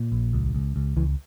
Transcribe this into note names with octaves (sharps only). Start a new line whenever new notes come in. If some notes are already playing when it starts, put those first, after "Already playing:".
Already playing: A#2
A#1
C#2
C#2
C#2
C#2 E3